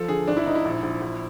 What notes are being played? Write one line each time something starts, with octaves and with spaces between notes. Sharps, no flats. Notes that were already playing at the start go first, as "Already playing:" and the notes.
Already playing: F3 A4
D3 G#4
G#1 D4
E4
G#2 D#4
E4
A#1
A#1
A#1